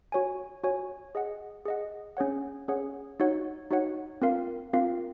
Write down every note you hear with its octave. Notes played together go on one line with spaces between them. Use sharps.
F#4 C#5 G#5
F#4 C#5 G#5
G#4 D#5 F#5
G#4 D#5 F#5
C#4 G#4 C#5 F#5
C#4 G#4 C#5 F#5
D#4 F#4 C#5 F#5
D#4 F#4 C#5 F#5
C4 F4 A#4 F5
C4 F4 A#4 F5